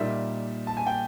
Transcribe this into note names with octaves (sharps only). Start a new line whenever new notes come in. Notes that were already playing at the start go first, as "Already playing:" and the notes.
Already playing: A#2 G3 A#3 D#4 E5
A5
G#5
G5